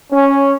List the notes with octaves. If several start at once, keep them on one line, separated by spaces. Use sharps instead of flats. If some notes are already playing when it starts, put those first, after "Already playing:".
C#4